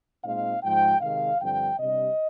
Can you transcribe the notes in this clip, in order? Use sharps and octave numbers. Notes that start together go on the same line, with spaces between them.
A#2 G#3 C4 D#4 F5
G#2 F3 G#3 G5
C3 D#3 G#3 F5
G2 D3 F3 C4 G5
C3 G3 D4 D#5